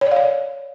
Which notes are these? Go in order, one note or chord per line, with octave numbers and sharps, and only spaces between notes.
C#5
D5
F5
C#5